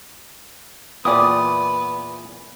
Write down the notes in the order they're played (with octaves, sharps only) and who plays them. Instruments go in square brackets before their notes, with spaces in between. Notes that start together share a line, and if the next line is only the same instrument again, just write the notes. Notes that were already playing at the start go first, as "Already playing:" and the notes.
[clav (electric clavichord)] E2 A#2 [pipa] G3 D5 [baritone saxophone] B3 [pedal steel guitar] D#6